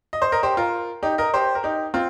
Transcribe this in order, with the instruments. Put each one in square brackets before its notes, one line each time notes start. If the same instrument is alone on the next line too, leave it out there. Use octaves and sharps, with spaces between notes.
[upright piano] D#5
C5
A#4 D#5
G4 C5
F4 A#4
D#4 G4
A#4 D#5
G4 C5
A#4
D#4 G4
C4 F4